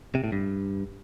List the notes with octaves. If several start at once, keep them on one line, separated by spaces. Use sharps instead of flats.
C3
A2
G2